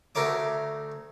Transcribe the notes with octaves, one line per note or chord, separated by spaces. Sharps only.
D2 A3 A#4 C#5 D6